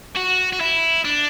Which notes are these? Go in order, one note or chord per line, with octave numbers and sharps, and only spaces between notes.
F#4
F#4
E4
D4